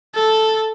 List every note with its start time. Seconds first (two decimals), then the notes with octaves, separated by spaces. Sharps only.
0.15 A4